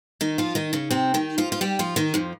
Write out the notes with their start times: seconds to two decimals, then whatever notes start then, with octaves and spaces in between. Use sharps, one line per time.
0.21 D#3 D#4
0.38 F3 F4
0.55 D#3 D#4
0.73 C#3 C#4
0.91 C3 C4
1.14 D#3 D#4
1.38 F3 F4
1.52 F4
1.61 G3 G4
1.79 F3 F4
1.96 D#3 D#4
2.14 F2 F3